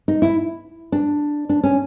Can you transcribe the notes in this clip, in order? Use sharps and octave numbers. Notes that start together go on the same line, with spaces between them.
D#4
E4
D4
D4
C#4